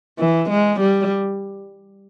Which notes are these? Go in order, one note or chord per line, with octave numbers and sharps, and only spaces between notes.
E3
G#3
G3